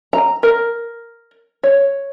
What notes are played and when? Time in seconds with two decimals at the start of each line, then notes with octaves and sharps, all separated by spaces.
0.13 A#5
0.43 A#4
1.63 C#5